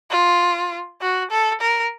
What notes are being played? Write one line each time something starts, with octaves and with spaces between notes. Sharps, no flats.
F4
F#4
A4
A#4